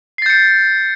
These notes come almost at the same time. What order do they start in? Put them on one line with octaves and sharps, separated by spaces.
C7 A6 G6 C#7